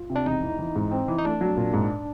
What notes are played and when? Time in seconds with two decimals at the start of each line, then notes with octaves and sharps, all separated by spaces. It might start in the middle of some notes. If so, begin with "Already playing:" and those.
Already playing: F4
0.10 C3
0.16 D4
0.26 E1 D#4
0.42 E3
0.59 E3
0.76 G#2
0.91 C4
1.08 E3
1.18 D#4
1.25 A3 D4
1.41 F#3
1.57 A#2
1.73 G#2